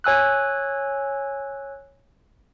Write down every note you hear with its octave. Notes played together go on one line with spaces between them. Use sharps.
C#5 G#5 E6 F#6